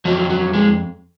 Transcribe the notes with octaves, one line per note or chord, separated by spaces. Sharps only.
F2 F3 F#3
F3
F#3
G#3